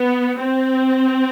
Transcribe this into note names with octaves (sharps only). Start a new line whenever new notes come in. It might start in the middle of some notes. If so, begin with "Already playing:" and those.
Already playing: B3
C4